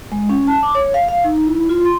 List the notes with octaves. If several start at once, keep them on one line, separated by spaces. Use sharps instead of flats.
G#3
C#4
A5
D6
C#5
F5
F5
D#4
E4
F4
C6